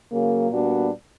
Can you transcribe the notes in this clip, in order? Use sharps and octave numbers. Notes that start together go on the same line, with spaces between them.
C#3 F#3 A#3
A#2 G3 B3 D4 F#4